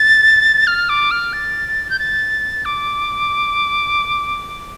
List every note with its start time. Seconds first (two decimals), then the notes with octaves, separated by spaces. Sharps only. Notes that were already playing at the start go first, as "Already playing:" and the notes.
Already playing: A6
0.67 F6
0.89 D6
1.11 F6
1.33 A6
1.90 G6
1.99 A6
2.65 D6